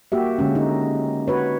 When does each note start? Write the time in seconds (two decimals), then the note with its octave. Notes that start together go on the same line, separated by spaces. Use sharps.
0.12 A#3 F#4 G4 E5
0.39 D3 G#3 C#4
0.55 D#4
1.28 F#4 B4 C#5